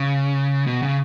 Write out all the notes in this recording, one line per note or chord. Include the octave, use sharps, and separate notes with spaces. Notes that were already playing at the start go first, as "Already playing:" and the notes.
Already playing: C#3
B2
C#3